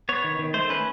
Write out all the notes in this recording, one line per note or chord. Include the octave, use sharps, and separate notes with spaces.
B3 C#5
D#3
D#3
A3 C5
C#4 B4